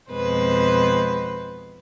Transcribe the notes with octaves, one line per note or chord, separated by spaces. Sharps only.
F2 B2 G#3 B4 C5